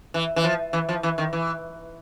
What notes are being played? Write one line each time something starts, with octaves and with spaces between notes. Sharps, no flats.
E3
E3
F3
E3
F3
E3
D#3
E3